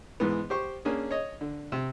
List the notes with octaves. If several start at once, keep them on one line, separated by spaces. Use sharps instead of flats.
G#2 E3 B3
G4 C5 C#6
A#3 C#4 D4 G#4
C#5 D#5
D3
C3